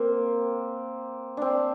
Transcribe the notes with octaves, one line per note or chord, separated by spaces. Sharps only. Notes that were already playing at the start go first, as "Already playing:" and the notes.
Already playing: A#3 C4
C4 D4